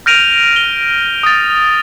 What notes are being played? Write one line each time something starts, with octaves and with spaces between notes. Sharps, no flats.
F6 G6 A#6 D7 D#7 F7
G7
D#6 A6